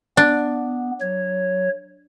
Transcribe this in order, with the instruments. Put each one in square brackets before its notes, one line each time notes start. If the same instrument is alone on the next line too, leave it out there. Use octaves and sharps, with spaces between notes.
[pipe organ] B3 [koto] D4
[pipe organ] F#3 C#5